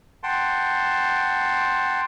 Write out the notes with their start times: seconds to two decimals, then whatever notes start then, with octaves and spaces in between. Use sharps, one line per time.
0.23 F#5 G5 A5 C6